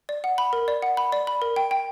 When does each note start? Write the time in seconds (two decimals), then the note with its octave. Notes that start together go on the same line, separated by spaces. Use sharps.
0.09 D5
0.24 F#5
0.38 B5
0.53 A#4
0.68 D5
0.82 F#5
0.97 B5
1.12 D5
1.27 B5
1.42 A#4
1.56 G5
1.71 G5